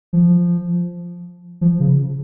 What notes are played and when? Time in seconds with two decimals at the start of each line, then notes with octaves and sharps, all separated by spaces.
0.13 F3
1.61 F3
1.80 C#3